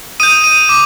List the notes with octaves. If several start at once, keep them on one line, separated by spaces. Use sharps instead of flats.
D#6 G6 D#7
D#7
D6